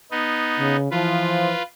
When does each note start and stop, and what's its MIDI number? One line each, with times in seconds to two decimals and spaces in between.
0.11 0.76 59
0.11 0.76 63
0.59 0.91 49
0.91 1.53 52
0.91 1.53 53
0.91 1.63 65
0.91 1.63 71